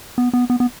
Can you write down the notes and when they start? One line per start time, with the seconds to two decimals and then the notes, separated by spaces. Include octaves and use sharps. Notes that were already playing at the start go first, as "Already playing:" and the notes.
0.18 B3
0.33 B3
0.50 B3
0.60 B3